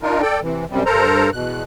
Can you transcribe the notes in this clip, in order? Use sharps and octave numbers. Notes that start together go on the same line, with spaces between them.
D4 D#4 F4 A#4
A4 D5 G5
C3 E3
F#2 C3 G3
G2 A4 A#4 C5 A#5
E2 B2 F#6